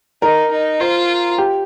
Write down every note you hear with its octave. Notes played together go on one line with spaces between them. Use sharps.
D#4 A#4
D#4
F4 C5
G4